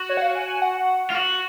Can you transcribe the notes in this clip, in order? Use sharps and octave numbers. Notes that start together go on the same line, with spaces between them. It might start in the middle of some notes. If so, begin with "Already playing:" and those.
Already playing: F#4
C#5
F#5
F5
G#5
G#5
F#5
F4
F#4